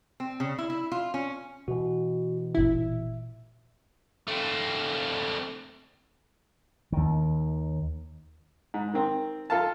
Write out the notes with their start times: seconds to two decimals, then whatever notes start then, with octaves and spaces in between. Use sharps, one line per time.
0.20 C4
0.40 C#3
0.58 E4
0.70 E4
0.92 F4
1.14 C#4
1.68 B2 E3 F#4
2.55 G1 A#2 E4 E5
4.28 A3 C4
6.92 D#2 D#3
8.74 G#2
8.94 D#3 C4
9.50 F4 A4 F5 A5